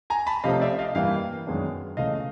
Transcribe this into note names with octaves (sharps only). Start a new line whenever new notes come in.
G#5 A#5
A5 B5
C3 F3 A3 C#4 D#5 F5
D5 E5
D#5 F5
G2 E3 G3 A#3 F5 G5
F#2 D#3 G#3 B3 D4
C#2 C#3 E3 A3 D#5 F5